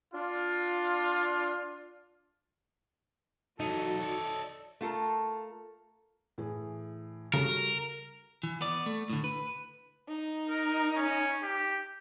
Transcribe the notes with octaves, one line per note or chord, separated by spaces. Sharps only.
D4 F4
E3 F#3 D#4 F#4 A4
C#5 D5
A3 F4 A4 A#4
A2 E3 G#4
C#3 G3 F#4 A4 A#4
E3
B3 D5
A3
A2 D3
B4
D#4
A#4
C#4
G4